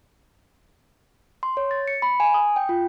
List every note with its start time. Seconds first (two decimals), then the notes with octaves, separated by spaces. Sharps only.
1.43 C6
1.57 C#5
1.71 A6
1.88 C#7
2.02 B5
2.20 G#5
2.34 D#6
2.56 G5
2.69 F4